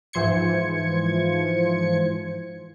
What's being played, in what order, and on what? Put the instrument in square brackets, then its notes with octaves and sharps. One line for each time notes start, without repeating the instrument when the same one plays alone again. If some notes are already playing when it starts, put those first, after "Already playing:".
[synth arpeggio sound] G#2 E3 F3 C5 G#6 C#7